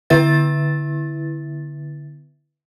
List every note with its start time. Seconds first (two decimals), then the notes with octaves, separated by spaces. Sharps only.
0.10 D3 B3 E4 B4 E5 A6